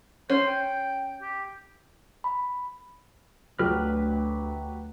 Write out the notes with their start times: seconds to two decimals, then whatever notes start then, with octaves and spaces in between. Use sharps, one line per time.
0.30 C#4 C5
0.46 G5
1.21 G4
2.24 B5
3.59 D2 F#3 G4 B4 F6